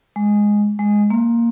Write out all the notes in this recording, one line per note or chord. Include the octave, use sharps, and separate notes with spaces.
G#3
G#3
A#3